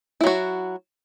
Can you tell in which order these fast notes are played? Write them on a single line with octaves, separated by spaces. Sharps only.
E4 F#3 F#4